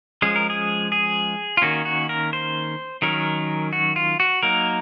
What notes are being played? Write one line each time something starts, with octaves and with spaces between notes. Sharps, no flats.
F3 G#3 C#4 G#4
A#4
G#4
G#4
F4
D#3 A#3 C#4 F#4
F#4
A#4
C5
D#3 F#3 C#4 A#4
F#4
F4
F#4
F#3 A#3 D#4 A#4